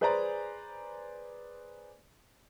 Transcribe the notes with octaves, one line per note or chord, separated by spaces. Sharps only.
G#4 B4 C5 D5 G#5 A#5